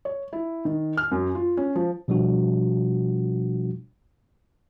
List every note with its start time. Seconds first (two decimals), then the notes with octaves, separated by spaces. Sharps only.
0.05 C#5
0.33 E4
0.65 D#3
0.97 F6
1.11 F#2
1.35 F4
1.57 C#4
1.75 F3
2.08 B2 F3 G3 D4 F#4